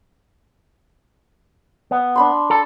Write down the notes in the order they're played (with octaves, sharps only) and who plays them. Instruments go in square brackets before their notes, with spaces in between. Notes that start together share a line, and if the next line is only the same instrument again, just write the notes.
[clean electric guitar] B3
[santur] D4 B5 C6
[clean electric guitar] A4